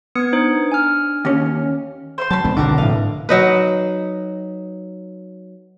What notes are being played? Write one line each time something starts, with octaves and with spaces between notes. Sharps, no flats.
B3 B4 D#6 G#6 C#7
D4 D#4 C5
G#5 F6
D#2 C#4
C5 E5 C6
F#3 A5 B5 C6
E2 G#3 C4
G1 C2 B2 D3 A#4 F#5 D6
F1 A2 D#5 F5
F#3 D#4 B4